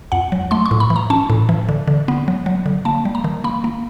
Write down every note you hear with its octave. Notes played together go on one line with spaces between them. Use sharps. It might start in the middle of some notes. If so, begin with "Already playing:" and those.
F2 F#5
F#3
A3 C6
C#6
A2
B5
E3
A#5
C#4 A5
A2
E3
D3
D3
B3
F#3
F#3
D3
A#3 A5
G3
A#5
D#3
A#3 B5
A#3